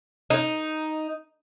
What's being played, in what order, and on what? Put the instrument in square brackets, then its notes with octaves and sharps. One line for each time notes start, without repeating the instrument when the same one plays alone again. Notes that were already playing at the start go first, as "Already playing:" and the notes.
[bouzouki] D#4